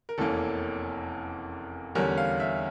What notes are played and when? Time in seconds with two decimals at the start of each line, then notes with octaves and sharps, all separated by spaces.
0.09 A#4
0.18 F1 E2 E3 A#3 C#4 A4
1.95 E2 D3 G3 C#4 A#4
2.18 F5
2.40 E5